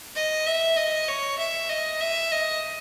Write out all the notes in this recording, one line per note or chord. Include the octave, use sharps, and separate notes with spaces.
D#5
E5
D#5
C#5
E5
D#5
E5
D#5